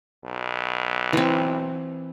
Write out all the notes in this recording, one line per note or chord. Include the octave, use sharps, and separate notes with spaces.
B1
E3 C4